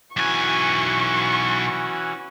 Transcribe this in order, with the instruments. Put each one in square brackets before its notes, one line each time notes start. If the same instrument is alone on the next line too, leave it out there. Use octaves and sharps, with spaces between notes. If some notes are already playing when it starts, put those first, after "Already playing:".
[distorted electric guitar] B1 G#5 [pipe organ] E3 C#4 F#4 [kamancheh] C#6